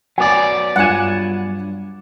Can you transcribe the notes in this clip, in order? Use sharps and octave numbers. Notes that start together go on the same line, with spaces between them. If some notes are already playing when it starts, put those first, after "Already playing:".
F#3 B3 D5 G#5 D6
G2 F4 F#5 G#5 E7